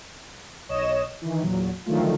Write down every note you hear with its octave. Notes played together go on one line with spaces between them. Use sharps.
B1 C#5 D#5 E7
D#3 E3
E2 A#2 F#3
D3 D#3 F3 F#3 A3 F4